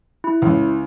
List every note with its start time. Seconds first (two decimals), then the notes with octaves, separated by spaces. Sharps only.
0.24 E4
0.42 C#2